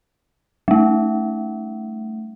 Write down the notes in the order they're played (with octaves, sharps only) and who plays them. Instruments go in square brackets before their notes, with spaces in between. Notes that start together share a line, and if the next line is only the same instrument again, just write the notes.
[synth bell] G3 A3